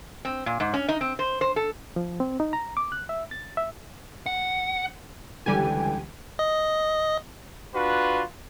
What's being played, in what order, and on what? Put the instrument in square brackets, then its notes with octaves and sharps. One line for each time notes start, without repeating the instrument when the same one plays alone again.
[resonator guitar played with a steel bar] C4
A#2
G#2
C#4
D#4
C4
C5
C5
A4
[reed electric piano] F3
C4
D#4
A#5
D6
F#6
E5
A6
E5
[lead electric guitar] F#5
[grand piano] C#2 D3 E3 [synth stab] G3 G4 G#5 [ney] G5
[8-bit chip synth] D#5
[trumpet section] D4 F4 F#4 B4